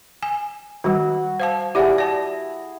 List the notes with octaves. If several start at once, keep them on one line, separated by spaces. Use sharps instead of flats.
G#5
D#3 G3 F#4
C5 F5 A5
E4 G4 G#4 D5 F#5
D5 A5